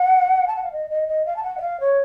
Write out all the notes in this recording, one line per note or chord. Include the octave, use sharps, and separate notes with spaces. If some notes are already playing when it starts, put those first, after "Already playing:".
Already playing: F#5
A5
F#5
F5
D#5
D#5
D#5
F5
A5
F#5
D#5
F5
C#5